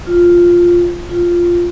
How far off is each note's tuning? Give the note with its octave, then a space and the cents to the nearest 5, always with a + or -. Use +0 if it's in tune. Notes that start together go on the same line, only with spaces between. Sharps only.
F4 +0
F4 -5